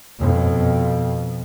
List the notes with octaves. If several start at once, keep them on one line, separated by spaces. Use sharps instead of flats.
F2 B2